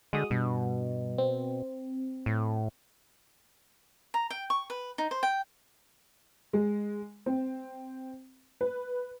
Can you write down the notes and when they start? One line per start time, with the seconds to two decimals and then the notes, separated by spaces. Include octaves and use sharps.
0.13 D3 G#3 F#4 D#6
0.31 G2 B2
1.18 C4
2.26 A2
4.14 A#5
4.30 G5
4.50 C#6
4.70 B4
4.98 D#4
5.11 C5
5.23 G5
6.53 G#3
7.26 C4
8.61 B4